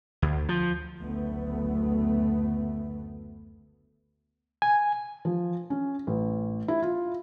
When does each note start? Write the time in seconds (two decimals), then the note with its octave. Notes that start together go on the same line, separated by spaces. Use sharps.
0.22 D2
0.49 F3
1.01 F#1 D2 A3 B3
4.62 G#5
5.25 F3
5.70 C#4
6.07 A1
6.68 E4
6.82 F4